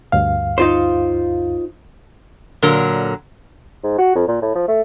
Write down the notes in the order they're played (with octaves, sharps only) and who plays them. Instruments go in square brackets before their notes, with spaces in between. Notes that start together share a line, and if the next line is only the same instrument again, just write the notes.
[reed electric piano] D2 G2 F5
[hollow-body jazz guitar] D#4 F4 C5
[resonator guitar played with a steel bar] A#2 D3 F#3 A#4
[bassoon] G#2
F#4
F2
A#2
A2
F3
A3